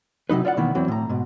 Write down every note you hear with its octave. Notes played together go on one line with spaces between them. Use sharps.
C3 F#3 D#4 B4
F4 D5 E5 F#5
B2 D#3 E3 A#3 B3
E2 E3 F#3 C4
A2 A#5
G#2 B2